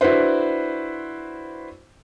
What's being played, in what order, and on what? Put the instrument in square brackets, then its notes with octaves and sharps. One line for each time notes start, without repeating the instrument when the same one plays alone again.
[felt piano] D4 E4 F#4 B4 C5